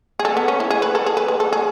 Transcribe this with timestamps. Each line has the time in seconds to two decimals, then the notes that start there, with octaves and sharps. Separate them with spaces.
0.19 G#4
0.25 A4
0.37 B3
0.48 C#4
0.60 E4
0.71 G#4
0.82 B4
0.95 A4
1.06 G#4
1.17 B4
1.28 G#4
1.40 A4
1.53 G#4